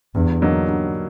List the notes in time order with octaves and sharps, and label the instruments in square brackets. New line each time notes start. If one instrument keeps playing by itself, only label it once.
[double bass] E2 [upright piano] G2
[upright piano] D3 F#3 A#3 D#4
G2